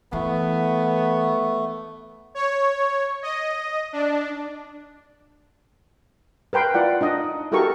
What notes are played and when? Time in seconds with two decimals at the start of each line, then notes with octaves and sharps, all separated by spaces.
0.13 E3 A3 B3
2.35 C#5
3.23 D#5
3.93 D4
6.53 A#4 B4 G5 C6
6.74 E4 F4 D5 F#5
7.01 D4 D#4 D#5
7.52 E4 F#4 G4 A4 A#4 C#6